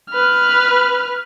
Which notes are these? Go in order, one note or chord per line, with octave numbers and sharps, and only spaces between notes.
B4 F6